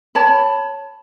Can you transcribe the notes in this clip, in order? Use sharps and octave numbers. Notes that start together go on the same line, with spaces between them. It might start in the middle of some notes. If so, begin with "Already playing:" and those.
C#5 A5 B5